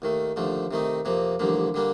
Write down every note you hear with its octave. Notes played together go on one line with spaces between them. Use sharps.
D#2 D#3 A3
D#2 D3 F3 A3
C3 D#3 A3 D#4
F2 C3 F3 A#3
A1 G2 D3 F3 A#3
D3 G3 A#3 D4